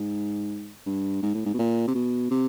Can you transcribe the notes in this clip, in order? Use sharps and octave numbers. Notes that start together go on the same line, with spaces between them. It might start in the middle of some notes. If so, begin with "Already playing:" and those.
Already playing: G#2
G2
G#2
A2
G#2
B2
A#2
C3
B2
C3